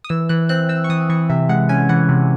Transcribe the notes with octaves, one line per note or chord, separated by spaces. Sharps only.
D#6
E3 E6
E3 F#6
C4 F#6
C4 E6
C#6
E3 D#6
E3 C#6
C3 E5
G#3 F#5
C#4 G#5
E3 F#5
C3